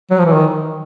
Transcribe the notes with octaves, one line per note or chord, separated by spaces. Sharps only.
F#3
F3
E3
D#3